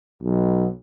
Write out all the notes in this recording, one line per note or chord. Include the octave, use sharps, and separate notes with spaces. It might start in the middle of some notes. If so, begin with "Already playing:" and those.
B1